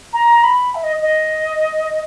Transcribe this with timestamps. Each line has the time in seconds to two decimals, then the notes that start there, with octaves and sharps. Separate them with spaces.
0.13 A#5
0.44 B5
0.75 E5
0.83 D#5
1.02 D#5